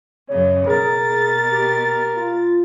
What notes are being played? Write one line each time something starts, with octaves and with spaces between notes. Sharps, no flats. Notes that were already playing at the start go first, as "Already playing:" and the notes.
F#2 C#3 C#5
B2 G#4 A#4 A6
G4
F4